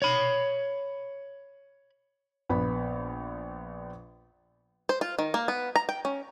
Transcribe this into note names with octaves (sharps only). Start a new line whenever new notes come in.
C#5 B5
A#1 B3 B5
C5
F4
D#3
A#3
B3
A#5
G5
C#4